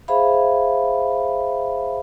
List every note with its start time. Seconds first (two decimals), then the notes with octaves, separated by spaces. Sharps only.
0.08 G#4 C5 E5 F5 B5